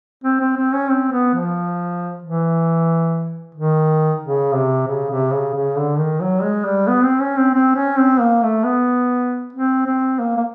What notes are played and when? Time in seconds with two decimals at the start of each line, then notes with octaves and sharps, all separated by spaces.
0.23 C4
0.40 C4
0.57 C4
0.73 C#4
0.90 C4
1.11 B3
1.34 F3
2.22 E3
3.55 D#3
4.22 C#3
4.54 C3
4.88 C#3
5.10 C3
5.32 C#3
5.54 C#3
5.76 D3
5.98 D#3
6.20 F#3
6.43 G#3
6.65 G3
6.87 B3
7.04 C4
7.21 C#4
7.37 C4
7.54 C4
7.75 C#4
7.98 C4
8.20 A#3
8.42 A3
8.64 B3
9.53 C4
9.86 C4
10.19 A#3
10.37 A#3